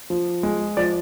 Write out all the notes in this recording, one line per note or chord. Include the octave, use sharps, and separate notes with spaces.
F3
G#3
F3 D5